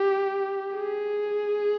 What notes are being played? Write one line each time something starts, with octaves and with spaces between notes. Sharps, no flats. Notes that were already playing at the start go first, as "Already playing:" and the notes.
Already playing: G4
G#4